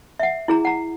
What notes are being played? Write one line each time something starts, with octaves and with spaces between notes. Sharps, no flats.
E5 F#5
E4 G#4 A#5
F#5 A#5